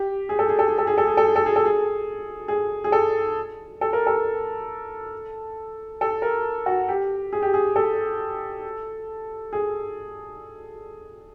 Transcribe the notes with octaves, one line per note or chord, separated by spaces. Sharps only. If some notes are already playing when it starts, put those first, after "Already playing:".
Already playing: G4
G#4
A4
G#4
A4
G#4
A4
G#4
A4
G#4
A4
G#4
A4
G#4
A4
G#4
G#4
G#4
A4
A4
A#4
A4
A4
A#4
F#4
G4
G#4
G4
G#4
A4
G#4